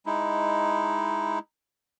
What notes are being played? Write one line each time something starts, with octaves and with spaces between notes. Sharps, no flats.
G#3 D#4 E4